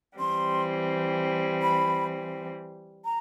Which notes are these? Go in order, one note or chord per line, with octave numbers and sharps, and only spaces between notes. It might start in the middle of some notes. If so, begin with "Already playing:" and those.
E3 G3 C4 C6
B5
A#5